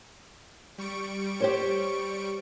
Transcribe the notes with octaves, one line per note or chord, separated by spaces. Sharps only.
G3 C#6 D7
G4 C5 C#5